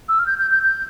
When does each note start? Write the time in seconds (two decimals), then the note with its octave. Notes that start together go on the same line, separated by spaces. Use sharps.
0.09 E6
0.19 F6
0.26 G6
0.39 G6
0.51 G6
0.63 G6